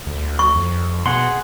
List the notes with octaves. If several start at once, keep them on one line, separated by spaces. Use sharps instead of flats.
D2
C#6
F2
B2 G#4 F#5 C6